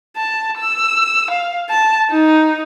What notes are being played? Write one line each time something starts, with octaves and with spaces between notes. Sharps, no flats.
A5
E6
F5
A5
D#4